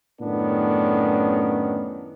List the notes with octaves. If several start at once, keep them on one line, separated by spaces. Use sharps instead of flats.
F#2 A2 D#3 B3 C#4 D4